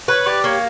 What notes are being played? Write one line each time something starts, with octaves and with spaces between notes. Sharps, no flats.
B4 C#5
G4 D5
A#3 C#5